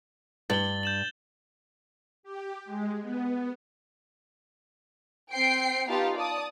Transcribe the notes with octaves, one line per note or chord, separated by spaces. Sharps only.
G2 A6 F#7 G7
G6 E7 F#7
G4
G#3
B3
C4 G5 C7 D7
B3 D#4 F4 G4 F5 A5
D5 A5 D#6